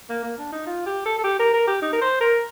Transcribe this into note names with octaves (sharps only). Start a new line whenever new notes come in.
A#3
A#3
D4
D#4
F4
G4
A4
A4
G4
A#4
A#4
G4
D#4
A#4
C5
A#4